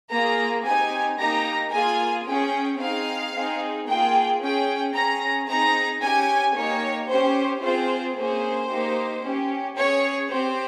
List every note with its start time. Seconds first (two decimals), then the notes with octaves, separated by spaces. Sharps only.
0.12 A#3 F4 G#4 A#5
0.66 C4 D#4 G4 G#5
1.20 A#3 D#4 G4 A#5
1.73 A#3 F4 G#4 G#5
2.27 C#4 G#4 G5
2.80 C4 D#4 G#4 F5
3.34 C4 D#4 G#4
3.87 A#3 F4 G#4 G5
4.41 C#4 G#4 G5
4.94 C#4 G#4 A#5
5.48 C4 D#4 G#4 A#5
6.01 C#4 G4 G#5
6.55 A#3 D#4 G4 C#5
7.08 C#4 G4 C5
7.62 C4 F4 G#4 C5
8.16 A#3 C#4 G#4 C5
8.70 A#3 D#4 G4
9.23 C#4 G4
9.77 C#4 G#4 C#5
10.31 C4 G4 C5